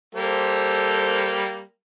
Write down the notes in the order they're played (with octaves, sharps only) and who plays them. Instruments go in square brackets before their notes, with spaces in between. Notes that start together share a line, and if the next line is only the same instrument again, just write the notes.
[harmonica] G3 A#3 G4 [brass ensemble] A4 C5